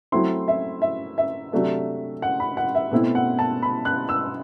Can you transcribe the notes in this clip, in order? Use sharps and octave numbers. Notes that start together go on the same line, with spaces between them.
F#3 A3 C4 E4 C6
E5
E5
E5
C3 F#3 A3 D4
F#5
B5
F#5
E5
B2 A3 C4 E4
F#5
A5
B5
F#6
E6